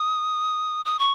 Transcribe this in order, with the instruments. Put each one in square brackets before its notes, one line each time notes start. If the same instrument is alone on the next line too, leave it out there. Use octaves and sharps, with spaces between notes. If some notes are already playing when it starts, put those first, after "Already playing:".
Already playing: [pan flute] D#6
D#6
C#6